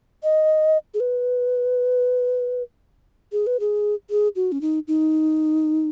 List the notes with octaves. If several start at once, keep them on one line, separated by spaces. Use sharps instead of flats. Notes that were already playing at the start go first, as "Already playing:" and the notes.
D#5
G#4
B4
G#4
B4
G#4
G#4
F#4
C#4
D#4
D#4